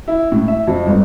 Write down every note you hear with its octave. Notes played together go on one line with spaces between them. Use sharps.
E4
A2
E5
F2
G1